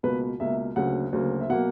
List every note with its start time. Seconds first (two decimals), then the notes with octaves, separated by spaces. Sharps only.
0.03 C#2 B2 A#3 B4
0.40 C#2 B2 A#3 E5
0.76 D2 C#3 F#3 A#3 F#5
1.13 D2 C#3 F#3 A#3
1.41 E5
1.50 B2 F#3 A#3 F#5